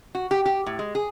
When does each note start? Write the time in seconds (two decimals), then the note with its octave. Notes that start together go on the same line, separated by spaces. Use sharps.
0.15 F#4
0.31 G4
0.46 G4
0.66 A2
0.79 G#3
0.95 G#4